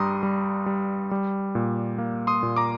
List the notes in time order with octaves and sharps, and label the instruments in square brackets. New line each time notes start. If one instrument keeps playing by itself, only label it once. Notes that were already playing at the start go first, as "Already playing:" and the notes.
Already playing: [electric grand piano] G2 G3 A#5 C6 D#6
G3
G3
G3
A#2
A#3
C6 D#6
A#2
A#5 D6